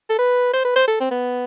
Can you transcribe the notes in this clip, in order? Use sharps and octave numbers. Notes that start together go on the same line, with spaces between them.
A4
B4
C5
B4
C5
A4
C4
B3